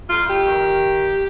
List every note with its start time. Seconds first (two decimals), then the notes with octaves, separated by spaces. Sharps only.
0.09 F2 F4
0.28 G4
0.46 D#3